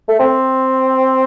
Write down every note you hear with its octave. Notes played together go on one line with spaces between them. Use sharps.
A3
C4